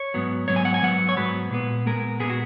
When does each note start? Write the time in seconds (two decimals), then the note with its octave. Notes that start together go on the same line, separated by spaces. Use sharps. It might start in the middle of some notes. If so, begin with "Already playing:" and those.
Already playing: C#5
0.14 G#2 F#3 B3
0.48 G#2 F#3 B3 C#5
0.56 G#5
0.65 F#5
0.74 G#5
0.82 G#2 F#3 B3 F#5
1.09 C#5
1.16 G#2 F#3 B3 B4
1.51 A#2 G#3 B3
1.86 A#2 G#3 B3 A#4
2.20 A#2 G#3 B3 G#4
2.30 F#4